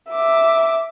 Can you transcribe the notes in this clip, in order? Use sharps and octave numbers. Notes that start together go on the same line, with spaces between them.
E5 D6